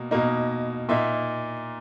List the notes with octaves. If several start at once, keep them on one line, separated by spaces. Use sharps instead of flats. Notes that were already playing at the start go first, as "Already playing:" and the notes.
Already playing: B2 A#3
B2 A#3 D#4
A#2 A#3 D#4 E5